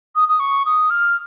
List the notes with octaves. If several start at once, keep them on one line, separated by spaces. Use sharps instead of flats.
D#6
D#6
C#6
D#6
F6